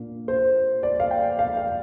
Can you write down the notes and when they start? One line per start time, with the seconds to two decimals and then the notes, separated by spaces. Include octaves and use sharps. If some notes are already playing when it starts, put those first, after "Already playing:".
Already playing: A#2 A#3 D4
0.28 C5
0.83 D5
1.00 F5
1.11 G5
1.39 F5
1.57 F5